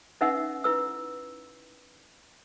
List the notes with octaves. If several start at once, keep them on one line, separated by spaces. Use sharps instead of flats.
C#4 D#4 B4 E5 F#5 E6
E4 B4 E6